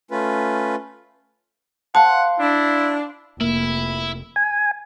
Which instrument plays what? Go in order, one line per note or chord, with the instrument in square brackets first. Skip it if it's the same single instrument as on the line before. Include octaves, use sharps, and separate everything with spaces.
[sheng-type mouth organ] A3 C#4 F4 B4
[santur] C5 F5 [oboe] F#5 [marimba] A5
[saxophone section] D4 [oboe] E4
[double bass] F1 [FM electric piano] A#3 [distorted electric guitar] E4
[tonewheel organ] G#5